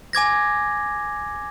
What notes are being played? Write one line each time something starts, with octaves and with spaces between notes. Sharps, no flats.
G#5 D6 G#6 A#6